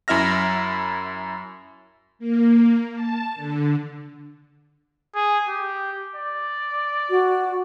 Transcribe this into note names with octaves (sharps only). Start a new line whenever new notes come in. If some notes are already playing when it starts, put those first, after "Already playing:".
F#2 E4 E5 F6 A#6
A#3
A5
D3
G#4
G4
D5
F#4